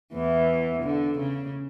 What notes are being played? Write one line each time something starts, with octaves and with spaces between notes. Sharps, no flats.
E2 E3
D3
C#3